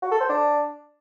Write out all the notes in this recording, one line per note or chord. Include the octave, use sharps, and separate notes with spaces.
F#4
A4
C5
D4